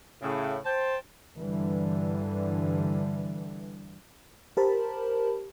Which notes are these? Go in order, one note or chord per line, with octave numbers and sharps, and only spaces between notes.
A2 C#3
C5 G5 A5
G2 D3 E3 G3
G4 A#4 C5 A5 B5